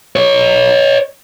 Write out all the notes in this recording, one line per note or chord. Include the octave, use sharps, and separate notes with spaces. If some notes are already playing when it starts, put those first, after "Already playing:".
B4 C#5